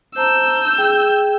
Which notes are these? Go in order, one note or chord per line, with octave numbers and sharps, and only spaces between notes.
C5 A5 A#5 E6 G6
G#4 G5